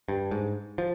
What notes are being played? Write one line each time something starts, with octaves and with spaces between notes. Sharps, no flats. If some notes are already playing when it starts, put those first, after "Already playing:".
G2
G#2
F3